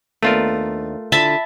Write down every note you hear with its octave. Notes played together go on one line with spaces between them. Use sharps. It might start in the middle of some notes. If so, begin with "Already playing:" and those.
D#2 A3 B3 D4 F4 A#4
D3 E4 F4 E5 A5 B5